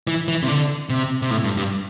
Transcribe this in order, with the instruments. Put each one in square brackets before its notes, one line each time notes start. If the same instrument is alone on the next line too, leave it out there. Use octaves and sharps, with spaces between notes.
[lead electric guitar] E3
E3
C3
D3
C3
C3
A2
G2
G2